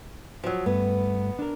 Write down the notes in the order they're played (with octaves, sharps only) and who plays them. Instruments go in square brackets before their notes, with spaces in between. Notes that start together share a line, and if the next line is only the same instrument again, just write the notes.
[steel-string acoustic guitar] F3 F#3
[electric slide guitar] G2 A3 [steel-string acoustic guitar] B3
[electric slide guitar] D4 A#4